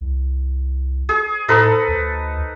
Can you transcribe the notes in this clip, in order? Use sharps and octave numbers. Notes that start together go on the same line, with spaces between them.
C2
G#4
A2 D#4 A4 B4
D2